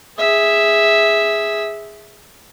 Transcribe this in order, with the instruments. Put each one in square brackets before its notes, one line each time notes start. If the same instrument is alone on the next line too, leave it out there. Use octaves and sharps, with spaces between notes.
[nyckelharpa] G#4 E5